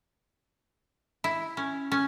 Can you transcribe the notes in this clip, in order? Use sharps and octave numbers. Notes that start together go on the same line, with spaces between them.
E4
C#4
C#4